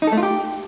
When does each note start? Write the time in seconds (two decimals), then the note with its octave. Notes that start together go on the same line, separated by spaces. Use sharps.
0.02 D#4
0.07 A4
0.12 A3
0.18 F4
0.23 G4